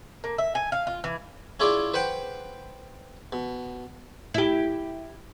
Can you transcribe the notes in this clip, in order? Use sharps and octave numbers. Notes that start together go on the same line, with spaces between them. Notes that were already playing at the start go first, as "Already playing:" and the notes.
A#3
E5
G#5
F5
F4
E3
C#4 E4 F4 G#4 D5
B4 C5 F#5 G5
B2
E4 G4